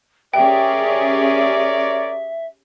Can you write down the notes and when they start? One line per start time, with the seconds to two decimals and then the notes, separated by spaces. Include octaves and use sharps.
0.34 C#4 G4 G#4 A#4 C#5 D5 E5 G5